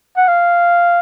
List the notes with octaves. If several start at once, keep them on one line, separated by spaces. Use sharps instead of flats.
F#5
F5